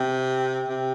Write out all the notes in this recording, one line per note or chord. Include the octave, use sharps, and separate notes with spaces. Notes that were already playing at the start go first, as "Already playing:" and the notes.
Already playing: C3
C3